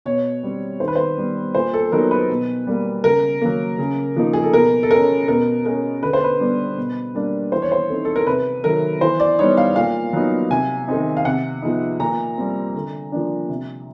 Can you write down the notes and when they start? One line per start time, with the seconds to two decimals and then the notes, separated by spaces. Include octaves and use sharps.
0.06 B2 C#5
0.43 G3 C4
0.80 D#3 C5
0.88 B4
0.95 C5
1.18 G3 B3
1.55 A#2 C5
1.74 A4
1.92 F#3 B3 D#4 A#4
2.11 B4
2.30 B2
2.67 G3 A#3
3.04 C#3 A#4
3.41 F#3 A#3
3.79 C#3
4.16 F3 A#3 D#4
4.33 G#4
4.44 A4
4.53 B2 A#4
4.83 A4
4.90 G#3 C#4 A#4
5.28 B2 A#4
5.65 G#3 C#4 A#4
6.02 D3 B4
6.13 C5
6.24 B4
6.40 G3 B3 D4
6.77 B2
7.15 G3 A#3 D4
7.52 E3 C5
7.62 C#5
7.72 C5
7.89 A3 C4 D#4
8.05 A4
8.16 A#4
8.27 C3 B4
8.64 D#3 F#3 A3 A#4
9.01 E3 C5
9.20 D5
9.39 G3 B3 D#4 C#5
9.57 F5
9.76 A#2 F5
10.13 F#3 B3 D#4
10.50 C3 G#5
10.88 D#3 G#3 C4 D#4
11.17 F5
11.25 C3 F#5
11.62 F3 G#3 B3 D#4
12.00 A#2 A#5
12.38 G3 C4
12.75 D3
13.12 F3 A#3 D4
13.49 C3